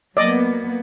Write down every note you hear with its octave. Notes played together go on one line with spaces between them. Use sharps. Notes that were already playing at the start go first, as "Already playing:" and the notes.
F#3 A#3 B3 D5 D#5